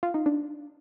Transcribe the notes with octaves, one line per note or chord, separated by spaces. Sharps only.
F4
D#4
D4